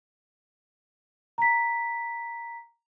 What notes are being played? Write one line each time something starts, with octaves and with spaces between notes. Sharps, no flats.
A#5 B6